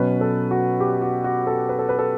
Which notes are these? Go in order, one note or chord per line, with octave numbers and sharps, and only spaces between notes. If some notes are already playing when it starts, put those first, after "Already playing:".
Already playing: B2 F#3 C#4 B4
A4
F#4
G4
F#4
F#4
A4
B4
A4
B4
A4